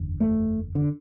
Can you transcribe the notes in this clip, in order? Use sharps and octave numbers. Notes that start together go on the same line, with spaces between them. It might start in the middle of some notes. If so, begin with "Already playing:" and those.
Already playing: F#1 E2 D3
A3
D3